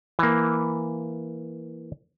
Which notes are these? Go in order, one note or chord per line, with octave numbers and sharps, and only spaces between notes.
E3 A#3